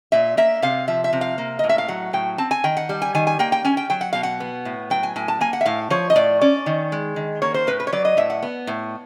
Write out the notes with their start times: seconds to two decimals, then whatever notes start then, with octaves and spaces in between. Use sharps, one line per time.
0.12 A#2 E5
0.37 A#3 E5
0.62 C3 F5
0.88 F3 E5
1.04 E5
1.13 C3
1.21 F5
1.38 A#3
1.59 A2 D#5
1.69 E5
1.78 F5
1.88 F#3 F#5
2.13 A2 G5
2.38 C4 A5
2.51 G#5
2.64 D#3 G5
2.77 F#5
2.89 G3
3.02 G#5
3.15 D#3 G#5
3.27 G#5
3.39 A#3 G5
3.52 G5
3.64 C#4 G#5
3.77 G5
3.90 F#3 G5
4.01 F#5
4.13 B2 F5
4.23 F#5
4.40 B3
4.65 A2
4.90 F#3 G5
5.03 G#5
5.16 A2 G#5
5.28 A5
5.41 A#3 G#5
5.53 F#5
5.61 E5
5.66 A2 F5
5.90 F3 C#5
6.10 D#5
6.16 A2 D5
6.41 C#4 D5
6.66 D#3
6.92 G#3
7.16 D#3
7.42 A#3 C#5
7.54 C5
7.67 A2 B4
7.80 B4
7.87 C#5
7.92 F#3 D5
8.05 D#5
8.17 A2 E5
8.30 F#5
8.43 B3
8.67 A2